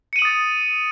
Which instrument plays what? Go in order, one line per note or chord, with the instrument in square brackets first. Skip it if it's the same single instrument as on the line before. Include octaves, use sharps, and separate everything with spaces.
[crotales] C#7
D#7
F#7
D#6
A6